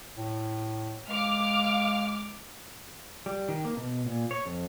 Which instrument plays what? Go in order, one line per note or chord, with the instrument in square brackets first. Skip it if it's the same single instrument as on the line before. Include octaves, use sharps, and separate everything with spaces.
[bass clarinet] A2
[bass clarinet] G#3 [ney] F5 [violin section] D6 F6
[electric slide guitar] G3
D#3
A#3
B2
A#2
C#5
F2